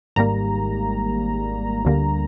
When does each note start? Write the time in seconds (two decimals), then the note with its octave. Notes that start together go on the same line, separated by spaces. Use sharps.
0.16 G#1 G#2 G3 A#3 A#5
1.85 D2 D3 G3 A#3